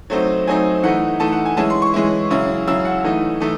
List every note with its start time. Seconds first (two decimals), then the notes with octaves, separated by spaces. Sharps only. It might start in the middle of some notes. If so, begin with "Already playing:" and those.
0.10 F#3 A3 C4 D#4
0.47 F#3 A3 C4 D#4 G#5
0.83 E3 A3 D#4 F#5
1.20 E3 A3 D#4 A5
1.32 F#5
1.45 G#5
1.57 E3 G#3 C#4 E4 A5
1.70 C6
1.82 C#6
1.94 E3 G#3 C#4 E4
2.30 C#3 F#3 C#4 E4
2.67 C#3 F#3 C#4 E4 E6
2.85 F#5
3.05 E3 A3 D#4
3.41 E3 A3 D#4